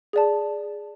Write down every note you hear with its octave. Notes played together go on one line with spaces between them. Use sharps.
G#4 D5 A5